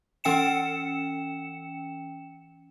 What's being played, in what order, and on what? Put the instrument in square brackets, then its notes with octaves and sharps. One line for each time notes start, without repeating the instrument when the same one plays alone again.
[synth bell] E3 C#4 G5 C#7 E7